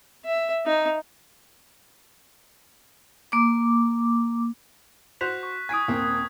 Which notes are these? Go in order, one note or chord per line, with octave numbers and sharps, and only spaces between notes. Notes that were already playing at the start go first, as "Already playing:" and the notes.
E5
D#4
A#3 D6
F#4 C5 F#6 B6 F7
C#6
G#5 D#6 G#6 B6 D7
D#1 A#3 C4